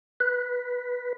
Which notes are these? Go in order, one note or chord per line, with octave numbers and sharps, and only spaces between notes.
B4